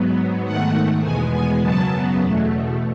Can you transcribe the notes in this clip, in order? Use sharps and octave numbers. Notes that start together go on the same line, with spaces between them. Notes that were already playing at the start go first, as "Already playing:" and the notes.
Already playing: G#2 F#3 B3
G#2 D#3 A3 F#5
E2 B2 G#3 B3 G#5
G#5
F#2 C#3 F#3 B3 A5
E2 B2 A3